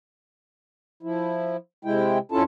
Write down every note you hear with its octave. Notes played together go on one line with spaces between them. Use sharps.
F3 E4
C3 G#3 E4 G5
F2 C#4 E4 F4 A4 A5